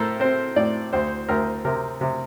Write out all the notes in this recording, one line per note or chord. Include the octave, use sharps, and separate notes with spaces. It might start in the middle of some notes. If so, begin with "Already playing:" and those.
Already playing: A2 A4 A#4 C5
C4 C5
A2 D5
D2 C5
D2 A#4
C3 A#4
C3